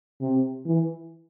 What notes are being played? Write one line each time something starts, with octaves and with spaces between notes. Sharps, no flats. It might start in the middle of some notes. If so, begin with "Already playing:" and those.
C3
E3